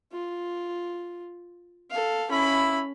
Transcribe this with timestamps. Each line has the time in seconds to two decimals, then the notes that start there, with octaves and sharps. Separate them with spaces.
0.12 F4
1.91 A4 F5
2.31 C#4 E4 B5